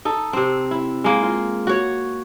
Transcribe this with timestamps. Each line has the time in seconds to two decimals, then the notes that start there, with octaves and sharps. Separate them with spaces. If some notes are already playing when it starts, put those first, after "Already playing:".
0.05 D#4 A4
0.33 C3 C4
0.71 E4
1.04 G#3 A#3
1.23 F4
1.67 F#4 C#5